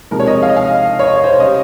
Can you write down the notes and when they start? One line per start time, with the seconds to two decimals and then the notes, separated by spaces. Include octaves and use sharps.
0.11 C3 F3 G#3 A#4
0.20 C#5
0.27 D#5
0.43 F5
0.50 D#5
0.56 F5
0.99 C#5
1.07 D#5
1.16 C#5
1.24 C5
1.31 C#5
1.40 C#3 G3 D#5